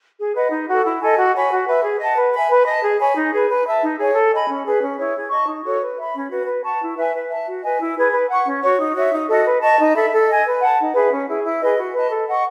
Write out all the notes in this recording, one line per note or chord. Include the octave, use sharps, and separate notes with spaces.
G#4
B4 D#5 F#5
D#4
F#4 A4
E4
A4 D#5 G#5
F#4
C#5 G#5 B5
F#4
B4 E5
G#4
D#5 F#5 A5
B4
E5 G#5 B5
B4
D#5 A5
G#4
C#5 G#5 B5
D#4
G#4 B4
B4
E5 A5
D#4
G#4 C#5 G#5
A4
D#5 G#5 B5
C#4
G#4 B4
C#4
E4 G#4 C#5
G#4
D#5 A5 C#6
D#4
F#4 A4 C#5
B4
E5 B5
C#4
F#4 B4
B4
F#5 A5 C#6
E4
B4 E5 G#5
B4
E5 A5
F#4
B4 D#5 G#5
E4
G#4 B4
B4
F#5 C#6
C#4
F#4 C#5
D#4
F#4 C#5 E5
D#4
F#4 A4 D#5
B4
D#5 A5 C#6
D#4
A4 E5 B5
A4
D#5 G#5
B4
F#5 A5
D#4
G#4 B4 E5
C#4
E4 G#4
E4
G#4 B4 D#5
F#4
B4 D#5 A5
A4
D#5 F#5 C#6